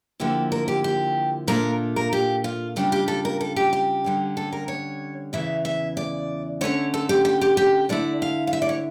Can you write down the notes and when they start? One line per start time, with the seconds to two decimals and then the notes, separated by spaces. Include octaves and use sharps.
0.20 D3 F3 A#3 E4 G4
0.52 A#4
0.68 G4
0.84 G4
1.47 A#2 A3 D4 F4 A#4
1.96 A#4
2.13 G4
2.44 F4
2.76 C#3 G3 D4 F4 G4
2.92 G4
3.08 A4
3.25 A#4
3.41 A4
3.56 G4
3.73 G4
4.04 D3 G3 C#4
4.37 A4
4.53 A#4
4.68 C#5
5.33 E2 C#3 E3 E5
5.65 E5
5.97 D5
6.61 D3 A3 C#4 C#5
6.94 A4
7.09 G4
7.25 G4
7.41 G4
7.57 G4
7.89 D3 A3 E4 D5
8.22 F5
8.47 F5
8.53 E5
8.62 D5
8.69 C#5